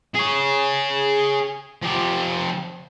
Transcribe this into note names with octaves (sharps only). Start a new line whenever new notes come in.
G#4 C#5
F3 G4